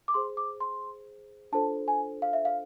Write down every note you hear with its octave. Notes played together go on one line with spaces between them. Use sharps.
D6
G#4 C5 C6
D6
C6
D4 F4 A4 C5 A5
G#5
F5
E5
F5